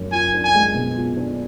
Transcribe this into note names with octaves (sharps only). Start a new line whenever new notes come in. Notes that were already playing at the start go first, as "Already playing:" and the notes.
Already playing: F#2
F4 G#5
D4
G#5
G#3
B2
F4
D4